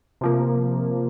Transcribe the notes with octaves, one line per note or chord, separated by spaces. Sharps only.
C3 F3 A#3